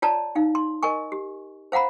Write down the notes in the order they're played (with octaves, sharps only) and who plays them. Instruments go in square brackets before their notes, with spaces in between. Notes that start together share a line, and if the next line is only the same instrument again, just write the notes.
[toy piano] F4 C#5 D5 A5 A#5
D#4 F5
C6
A#4 D#5 G#5 C#6
G4
C5 F5 F#5 A#5 B5